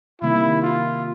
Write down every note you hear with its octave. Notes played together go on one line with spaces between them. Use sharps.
C3 D#3 G3 A#3 E4
F4